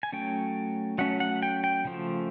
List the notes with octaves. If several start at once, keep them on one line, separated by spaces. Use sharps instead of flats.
G#5
F#3 A3 C#4 G5
F#3 A3 C#4 F#5
F#5
G5
G5
C#3 F3 A3